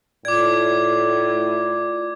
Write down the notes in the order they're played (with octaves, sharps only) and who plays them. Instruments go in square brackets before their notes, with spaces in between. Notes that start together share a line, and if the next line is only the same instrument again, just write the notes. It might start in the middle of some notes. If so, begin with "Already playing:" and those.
[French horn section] A2 [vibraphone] F4 D5 [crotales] D6 G#6